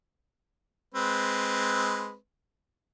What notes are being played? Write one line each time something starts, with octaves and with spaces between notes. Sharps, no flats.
G#3 C4 B4